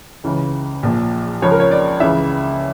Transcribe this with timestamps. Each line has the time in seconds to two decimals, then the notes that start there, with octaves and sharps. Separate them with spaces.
0.24 C#2 C#3 E3
0.83 A#1 A#2 F3
1.42 C#2 C#3 F3 C#5
1.52 A#4
1.60 C#5
1.71 D5
2.00 C#2 C#3 E3 E5